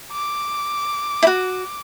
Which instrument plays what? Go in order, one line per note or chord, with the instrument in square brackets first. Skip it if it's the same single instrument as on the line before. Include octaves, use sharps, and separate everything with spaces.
[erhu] D6
[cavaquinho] E4 F#4